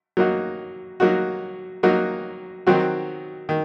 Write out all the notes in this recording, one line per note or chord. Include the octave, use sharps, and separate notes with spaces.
F#3 A#3 D#4 F#4
F#3 A#3 D#4 F#4
F#3 A#3 D#4 F#4
D#3 F#3 C4 F#4
D#3